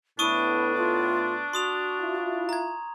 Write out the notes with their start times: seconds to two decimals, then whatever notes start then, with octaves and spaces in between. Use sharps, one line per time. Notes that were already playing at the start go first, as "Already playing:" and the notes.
0.19 A2 B3 D4 E4 C#6 D#6 D#7
0.78 F4
1.53 F#4 C6 D#6 F7
2.00 E4 F4
2.49 A#5 G#6